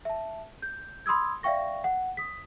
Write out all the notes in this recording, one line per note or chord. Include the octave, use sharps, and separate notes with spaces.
E5 A5
G6
B5 C6 D#6 E6 G#6
D5 E5 F5 G5 C#6 A#6
F#5
D#6 B6